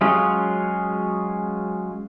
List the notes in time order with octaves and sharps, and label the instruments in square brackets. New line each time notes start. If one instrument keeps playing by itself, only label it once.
[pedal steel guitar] F#3 G#3 C#4 F4 G#4